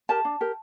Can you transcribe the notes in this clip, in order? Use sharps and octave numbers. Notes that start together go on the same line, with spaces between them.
G4 A#4 A5
D4
G4 A#4